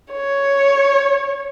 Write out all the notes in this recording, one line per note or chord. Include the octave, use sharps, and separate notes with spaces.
C#5